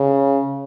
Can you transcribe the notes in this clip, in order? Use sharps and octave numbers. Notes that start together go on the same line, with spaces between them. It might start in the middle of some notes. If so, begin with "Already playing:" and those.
Already playing: C#3